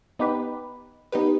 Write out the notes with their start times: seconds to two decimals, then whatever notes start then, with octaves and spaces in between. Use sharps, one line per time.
0.19 B3 D#4 G4 B4
1.12 B3 D#4 G4 B4